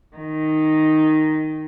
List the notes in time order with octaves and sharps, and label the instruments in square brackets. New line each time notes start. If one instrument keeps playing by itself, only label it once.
[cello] D#3 D#4